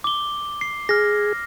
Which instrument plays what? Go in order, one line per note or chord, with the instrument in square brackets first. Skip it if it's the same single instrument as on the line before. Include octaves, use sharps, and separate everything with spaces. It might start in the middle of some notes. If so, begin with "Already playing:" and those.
[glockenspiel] D6 G7
C7
[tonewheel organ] G#4 [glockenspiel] F6 A#6